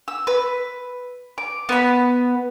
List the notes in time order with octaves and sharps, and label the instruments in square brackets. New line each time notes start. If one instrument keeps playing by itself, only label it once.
[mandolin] E6
B4
D6
B3 B4 B5